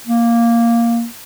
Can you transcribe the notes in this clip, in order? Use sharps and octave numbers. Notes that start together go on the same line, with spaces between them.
A#3